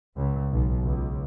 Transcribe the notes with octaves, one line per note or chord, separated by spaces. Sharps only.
C#2
B1
C#2